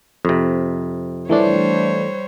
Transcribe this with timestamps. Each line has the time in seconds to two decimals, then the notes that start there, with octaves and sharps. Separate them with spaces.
0.25 F2 C3
1.29 E3 G3 A3 D4 C5 C#5